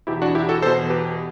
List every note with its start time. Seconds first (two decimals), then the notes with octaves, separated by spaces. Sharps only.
0.07 E2 B2 E4 G4
0.22 D4 F#4
0.35 E4 G4
0.49 F#4 A4
0.62 E2 B2 A4 C5
0.90 G4 B4